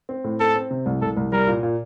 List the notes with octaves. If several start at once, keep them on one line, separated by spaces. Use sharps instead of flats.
C4
A2
C4 A4
C4
C3
C2
C2 A4
C2
G3 A#4
A#2
A#2